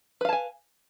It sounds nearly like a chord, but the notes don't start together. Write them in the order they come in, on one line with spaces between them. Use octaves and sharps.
B4 F5 A5 G#5